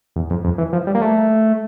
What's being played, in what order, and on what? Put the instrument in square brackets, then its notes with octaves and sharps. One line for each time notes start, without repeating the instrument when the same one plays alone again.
[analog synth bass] E2
F2
F2
E3
F3
G3
A#3
A3